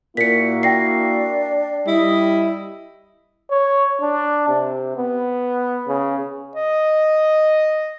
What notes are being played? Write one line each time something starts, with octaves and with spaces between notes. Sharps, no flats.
A#2 A#3 E4 F#4 B6 C#7
D4 G5 A#6 C7
G3 E4 D#5
C#5
D4
C3
B3
C#3
D#5